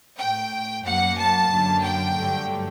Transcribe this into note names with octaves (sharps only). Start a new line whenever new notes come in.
A2 A3 G5
F#2 F#3 A#3 F#5
A5
F#2 D3 F#3 A#3
G5
G2 D3 F#3 A3